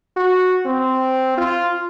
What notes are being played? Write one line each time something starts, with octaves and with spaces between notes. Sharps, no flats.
F#4
C4
F4